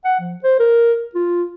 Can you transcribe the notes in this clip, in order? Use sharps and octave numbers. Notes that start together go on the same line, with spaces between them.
F#5
F3
C5
A#4
F4